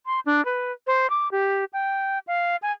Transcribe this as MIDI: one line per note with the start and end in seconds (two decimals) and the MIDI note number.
0.06 0.20 84
0.26 0.43 62
0.45 0.72 71
0.87 1.10 72
1.10 1.31 86
1.31 1.64 67
1.73 2.19 79
2.27 2.56 77
2.62 2.72 80